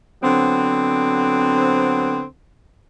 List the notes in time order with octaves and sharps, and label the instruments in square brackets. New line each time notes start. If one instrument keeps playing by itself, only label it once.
[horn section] D3 F#3 B3 C4